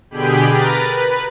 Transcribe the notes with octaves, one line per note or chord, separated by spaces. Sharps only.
B2 D3 G4 G#4 G5 B5
A#4 B4 A#5 A6
B4